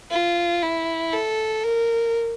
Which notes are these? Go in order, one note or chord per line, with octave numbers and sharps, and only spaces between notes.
F4
E4
A4
A#4